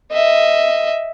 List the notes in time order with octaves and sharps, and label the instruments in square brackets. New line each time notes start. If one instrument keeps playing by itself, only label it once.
[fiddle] D#5 E5